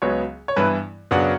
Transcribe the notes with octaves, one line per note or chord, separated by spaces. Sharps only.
C#2 C#3 F#3 B3 C#5
C#5
G2 E3 B3 E4 B4
F#2 C#3 F#3 B3 D4 F#5